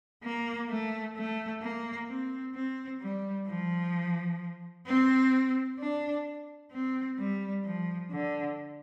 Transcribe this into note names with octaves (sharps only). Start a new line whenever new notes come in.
A#3
A3
A3
A#3
C4
C4
G3
F3
C4
D4
C4
G3
F3
D3